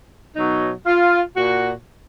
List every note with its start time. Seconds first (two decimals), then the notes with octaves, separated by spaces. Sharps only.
0.36 B2 F#3 D#4
0.86 F4
1.36 A#2 F#4